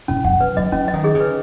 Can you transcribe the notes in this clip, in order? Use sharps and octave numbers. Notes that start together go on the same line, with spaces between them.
B2 C#4
F#2 F#5
F#2 B4
F#3 D#5
F#3 C#4
D#5
D#3
G#4
C#3
B4